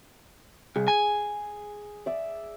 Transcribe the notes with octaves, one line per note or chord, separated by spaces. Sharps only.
C2 G#4
G#5
D5 E5